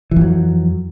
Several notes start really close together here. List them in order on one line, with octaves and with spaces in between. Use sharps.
E3 F2 F#3